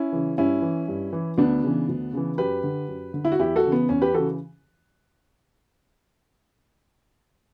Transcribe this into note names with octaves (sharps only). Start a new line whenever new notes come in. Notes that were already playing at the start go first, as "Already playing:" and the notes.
Already playing: C#4 E4
C#3 E3
G2 C#4 E4
E3
G2
E3
D2 B3 D4
C#3 E3
D2
C#3 E3
F#2 G4 B4
D3
F#2
D3
E4
F#4
E2 E4 G4
F#4 A4
C#3 E3
B3
E2 C#4
G4 B4
C#3 E3 F#4 A4